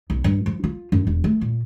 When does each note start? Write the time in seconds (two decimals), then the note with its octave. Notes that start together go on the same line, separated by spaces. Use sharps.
0.10 B1
0.24 G2
0.46 F3
0.64 F4
0.92 F#2
1.07 E1
1.24 A3
1.41 A#2